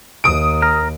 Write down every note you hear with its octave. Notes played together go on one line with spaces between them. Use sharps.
D#2 D#6 D7
A#4